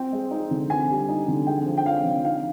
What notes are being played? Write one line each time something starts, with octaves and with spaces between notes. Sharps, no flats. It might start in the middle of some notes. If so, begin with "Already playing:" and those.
Already playing: C4 G5
G#3
D#4
D3
C4 G#5
G3
D#4
D3
G#3 G5
F3
G5
C4 F5
D3
D#4 F5